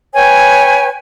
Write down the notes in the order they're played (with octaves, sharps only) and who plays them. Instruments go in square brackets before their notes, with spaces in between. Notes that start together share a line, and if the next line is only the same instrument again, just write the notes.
[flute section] B4 C#5 G5 G#5